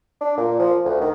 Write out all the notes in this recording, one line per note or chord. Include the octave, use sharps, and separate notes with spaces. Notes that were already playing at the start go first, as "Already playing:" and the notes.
D4
A#2
F3
D2
D#3